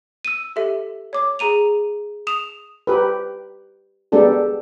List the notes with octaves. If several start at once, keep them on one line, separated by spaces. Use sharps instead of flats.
E6 D#7
G4 A4 E5
C#5 D6
G#4 A#5 D#7 F7
D#6 E7 F7
G4 B4
G#3 B3 D4 G4 A4